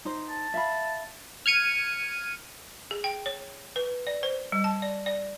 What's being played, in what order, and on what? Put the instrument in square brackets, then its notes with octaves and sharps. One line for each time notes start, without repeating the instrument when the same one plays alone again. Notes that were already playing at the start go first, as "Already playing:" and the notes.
[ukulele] D#4 C5
[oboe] A5
[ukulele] E5 F5 B5
[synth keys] F6 G#6 C#7 D#7
[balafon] G#4
G5
C#5
B4
D5
C5
G3
A5
D5
D5